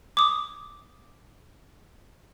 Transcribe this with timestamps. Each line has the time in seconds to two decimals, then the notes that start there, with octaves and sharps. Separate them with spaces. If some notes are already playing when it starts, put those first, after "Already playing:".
0.17 D6 D#6